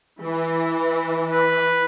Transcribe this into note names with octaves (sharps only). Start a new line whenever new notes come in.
E3
B4